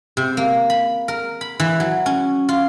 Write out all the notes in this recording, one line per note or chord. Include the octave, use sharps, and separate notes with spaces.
C3
A#3
B5
A#4
B5
E3
F#3
C#4
F4